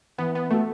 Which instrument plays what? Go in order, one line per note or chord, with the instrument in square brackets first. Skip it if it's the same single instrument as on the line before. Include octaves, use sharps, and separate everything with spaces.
[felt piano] E3 [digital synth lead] B3
[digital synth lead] B3
[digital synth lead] A3 [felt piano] B3 F#4 A4